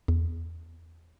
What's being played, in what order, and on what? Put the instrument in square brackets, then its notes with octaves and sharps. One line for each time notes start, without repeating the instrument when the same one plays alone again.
[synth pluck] E2